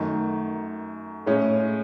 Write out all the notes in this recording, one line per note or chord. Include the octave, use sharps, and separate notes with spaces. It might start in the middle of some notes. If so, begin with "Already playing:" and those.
Already playing: F#2 D#3 A3
A2 G#3 C#4